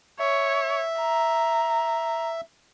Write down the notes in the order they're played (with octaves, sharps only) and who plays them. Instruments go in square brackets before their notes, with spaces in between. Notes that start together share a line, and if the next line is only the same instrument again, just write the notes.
[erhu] C#5 [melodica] E5
[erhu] A#5